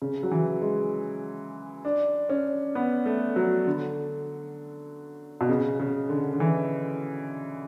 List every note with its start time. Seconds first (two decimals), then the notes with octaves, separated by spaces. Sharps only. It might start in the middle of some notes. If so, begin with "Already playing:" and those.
0.02 C#3
0.23 F#3
0.31 E3
0.62 G#3
1.85 D4
2.29 C#4
2.75 B3
3.06 A3
3.36 F#3
3.67 D3
5.41 B2
5.49 C#3
5.80 C#3
6.09 D3
6.33 D3
6.40 E3